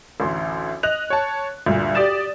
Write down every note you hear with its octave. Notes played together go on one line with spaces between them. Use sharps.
A1 D2 C6
D#5 F#6 F7
C#5 A5
D2 G2 A#2
G4 D5 D#6 A6 E7